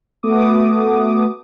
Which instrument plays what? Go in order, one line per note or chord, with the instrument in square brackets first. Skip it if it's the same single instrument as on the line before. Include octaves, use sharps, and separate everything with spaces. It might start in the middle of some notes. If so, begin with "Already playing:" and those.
[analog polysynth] A3 B3 F#4 D6 D#6